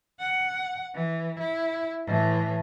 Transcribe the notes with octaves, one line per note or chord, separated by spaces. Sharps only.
F#5
E3
E4
A2 E3